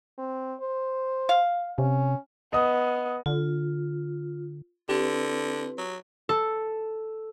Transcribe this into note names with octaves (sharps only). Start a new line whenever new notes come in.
C4
C5
F5
C3 C#4
B3 D#5 D#6
D3 F4
D3 C4 E4 G4 B4
F#3
A4